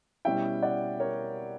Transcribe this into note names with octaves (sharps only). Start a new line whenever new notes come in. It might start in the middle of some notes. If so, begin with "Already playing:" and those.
B2 G3 C#4 E4 E5 G5
D5 F#5
A#4 C#5